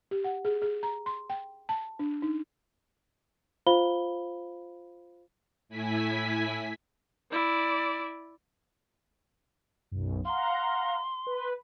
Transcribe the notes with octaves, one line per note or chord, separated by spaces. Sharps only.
G4
F#5
G#4
G#4
A#5
C6
G5
A5
D4
D#4
F4 C5 F5 B5 G7
A2 E4 G#5 B6
E4 D5
B1 F#2
F5 F#5 A#5 C6
B4